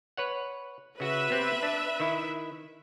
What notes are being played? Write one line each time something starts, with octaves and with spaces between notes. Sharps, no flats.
B4 C#5 F#5
C#3 F#4 B4 E5
B3 C4 G4
D4
D#3 E4